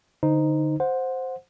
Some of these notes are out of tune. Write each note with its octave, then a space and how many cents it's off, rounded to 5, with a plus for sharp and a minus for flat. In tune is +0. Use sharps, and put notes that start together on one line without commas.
D3 +0 D#4 +0 C5 -20
C5 +0 F#5 -20